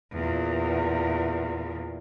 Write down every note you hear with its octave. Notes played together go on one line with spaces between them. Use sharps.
E2 A#2